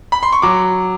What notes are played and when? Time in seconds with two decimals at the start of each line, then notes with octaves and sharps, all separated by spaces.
0.12 B5
0.23 C6
0.33 C#6
0.42 F#3 D6